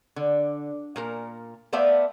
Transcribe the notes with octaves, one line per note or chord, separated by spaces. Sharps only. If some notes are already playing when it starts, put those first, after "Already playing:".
D3
A#2 A#3 A#4
A3 B3 C5 D5 E5 F5